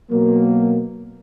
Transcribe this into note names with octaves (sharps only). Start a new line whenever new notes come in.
B2 F#3 A#3